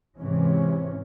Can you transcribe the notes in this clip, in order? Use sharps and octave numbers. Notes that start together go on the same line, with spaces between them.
G#2 C3 E3 C#4